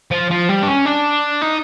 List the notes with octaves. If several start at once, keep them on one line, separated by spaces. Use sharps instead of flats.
F3
F3
G3
D4
C#4
D4
D#4